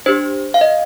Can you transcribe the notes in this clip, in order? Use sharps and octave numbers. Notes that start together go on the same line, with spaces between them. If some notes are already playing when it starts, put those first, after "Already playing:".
D4 G4 C5
F5
D#5